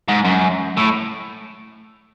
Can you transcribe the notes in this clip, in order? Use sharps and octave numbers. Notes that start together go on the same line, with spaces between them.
G#2
F#2
A2